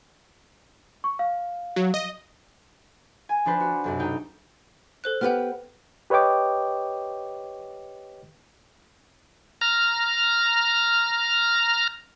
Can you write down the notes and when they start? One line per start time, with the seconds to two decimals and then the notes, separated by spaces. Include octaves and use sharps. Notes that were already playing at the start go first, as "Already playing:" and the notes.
1.04 C#6
1.19 F5
1.76 F#3
1.94 D#5
3.29 G#5
3.45 F3 D4 B4 C5
3.61 F#4
3.84 B1 F#2 C3
3.99 D#4 G5
5.04 A4 C5 F#6
5.21 B3 G4 B4 F#5 F6
6.10 G4 B4 C#5 D#5 G5 D6
9.61 A#5 F6